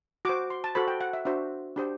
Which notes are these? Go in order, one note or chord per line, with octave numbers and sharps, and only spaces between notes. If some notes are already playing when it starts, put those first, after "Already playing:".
F#4 C5 D6
C6
A5
F#4 A4 C5 B5
G5
F#5
E5
D4 F#4 C5 E5
D4 G4 C5